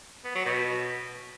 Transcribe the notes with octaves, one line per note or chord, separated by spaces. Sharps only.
B3
F#3
B2